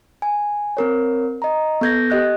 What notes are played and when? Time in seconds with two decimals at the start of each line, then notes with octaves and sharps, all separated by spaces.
0.22 G#5
0.77 C4 A#4 C#5
1.42 D#5 A#5
1.81 B3 A4 G6 G#6 A#6
2.10 G4 D#5 F#6